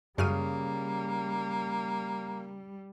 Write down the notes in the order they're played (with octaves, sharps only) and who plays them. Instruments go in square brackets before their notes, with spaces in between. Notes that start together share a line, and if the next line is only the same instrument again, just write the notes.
[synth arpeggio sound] F#2 F6 D#7 [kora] C#3 [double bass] G3 [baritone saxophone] A#3